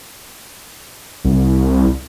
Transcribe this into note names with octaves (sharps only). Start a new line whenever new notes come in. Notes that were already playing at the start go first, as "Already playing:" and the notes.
C2